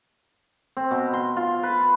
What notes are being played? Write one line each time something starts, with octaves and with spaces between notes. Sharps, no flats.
C4
B2
C6
F4
B4